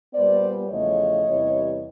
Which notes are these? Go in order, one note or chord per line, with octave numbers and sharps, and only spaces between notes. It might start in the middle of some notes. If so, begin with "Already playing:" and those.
A#2 G3 B3 C5 D5
E2 C#3 F3 A3 C#5 D#5
E2 C3 E3 G3